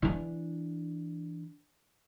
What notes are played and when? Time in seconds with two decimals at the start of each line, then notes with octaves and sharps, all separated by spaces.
0.02 E3 D4